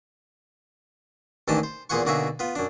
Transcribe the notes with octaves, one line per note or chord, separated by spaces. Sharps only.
A1 D#2 E3 D4 D#4 A5
C5
E2 A#2 G#4 C5 F#5 C#6
B1 D3 A#3 F#4 G#4 E5
B3 F4
F#2 D4